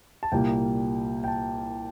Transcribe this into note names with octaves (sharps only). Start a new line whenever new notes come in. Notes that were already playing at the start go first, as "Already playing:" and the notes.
A5
C2 A#2 G3 A#3 G5
G5
A5